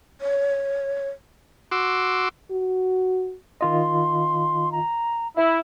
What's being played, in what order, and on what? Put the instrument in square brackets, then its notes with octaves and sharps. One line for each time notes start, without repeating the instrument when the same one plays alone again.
[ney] C#5
[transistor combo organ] F#4 C6 D6 E6
[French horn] F#4
[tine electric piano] D#3 F4 D#5 [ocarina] C6
[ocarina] A#5
[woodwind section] E4 [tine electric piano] E5